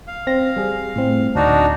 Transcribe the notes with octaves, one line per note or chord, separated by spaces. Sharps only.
F5
C4 A#6
G3 G#4
A2 C4
D2 D4 D#4 F#4